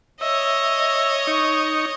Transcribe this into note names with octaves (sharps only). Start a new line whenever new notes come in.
C#5 D#5 E5
D#4 C#6